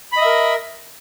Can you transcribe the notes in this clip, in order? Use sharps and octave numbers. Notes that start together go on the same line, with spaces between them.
A#4 D#5 E5 B5